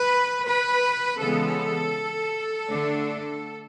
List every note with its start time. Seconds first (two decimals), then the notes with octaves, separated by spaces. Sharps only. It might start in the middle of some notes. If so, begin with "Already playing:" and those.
Already playing: B4
0.44 B4
1.19 C#3 E3 G#3 B3 A4
2.67 D3 A3 D4